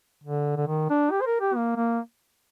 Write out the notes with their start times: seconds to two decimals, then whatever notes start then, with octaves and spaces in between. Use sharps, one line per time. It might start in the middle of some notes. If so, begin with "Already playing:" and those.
0.24 D3
0.57 D3
0.67 D#3
0.90 D4
1.11 G4
1.21 C5
1.26 A#4
1.41 G4
1.55 A#3
1.76 A#3